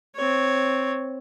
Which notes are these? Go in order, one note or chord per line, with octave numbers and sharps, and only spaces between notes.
C4 C#5